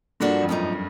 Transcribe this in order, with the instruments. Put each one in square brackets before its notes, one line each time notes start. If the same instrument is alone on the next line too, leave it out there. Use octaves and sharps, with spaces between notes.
[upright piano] G2 [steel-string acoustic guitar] F3 A#3 D4 F#4 A4
[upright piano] F2
[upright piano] F#2 [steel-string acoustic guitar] A2 F3 A#3 D#4